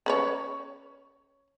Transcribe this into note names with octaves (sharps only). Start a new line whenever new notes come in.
C#4 B4 C#5